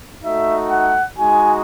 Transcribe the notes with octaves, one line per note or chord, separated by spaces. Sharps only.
A3 D#4 F#4 E5
F#5
G#3 D#4 F#4 G#5